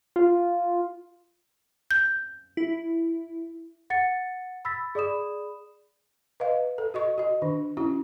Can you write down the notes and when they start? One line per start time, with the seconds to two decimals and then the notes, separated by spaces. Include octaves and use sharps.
0.16 F4
1.91 G6
2.57 E4
3.90 F#5 A6 C#7
4.65 B5 E6 A6 B6
4.95 G#4 D5 B5 D#6 E7
6.40 B4 D#5 F5
6.78 A4
6.94 F#4 D#5 C#6
7.18 F#4 D#5
7.42 D#3 D4
7.77 C#4 E4 F#4